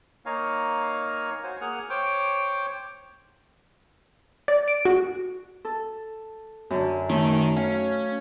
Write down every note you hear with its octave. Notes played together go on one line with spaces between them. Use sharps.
A#3 D#4 C#5 F5 G#5 A#5
F#4 C5 C#5 G#5
A#3 G#4 F#5 G#5 F6
C5 C#5 G5 D6
D5
D7
F#4
A4
F#2 D3
D#3 A3 C#4
C#4 F5